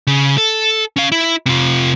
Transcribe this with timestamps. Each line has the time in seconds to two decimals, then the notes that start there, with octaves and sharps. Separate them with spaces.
0.07 C#3
0.38 A4
0.96 C#4 F5
1.12 E4
1.46 C3 F4